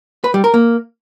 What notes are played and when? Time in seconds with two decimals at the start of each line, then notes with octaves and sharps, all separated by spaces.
0.24 B4
0.34 G3
0.44 A#4
0.54 A#3